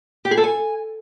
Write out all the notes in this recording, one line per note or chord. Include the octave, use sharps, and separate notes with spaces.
G4
G#4
A4
G#5